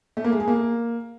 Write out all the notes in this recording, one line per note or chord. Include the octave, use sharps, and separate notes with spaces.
A3
A#3
G#3
G#4
A#3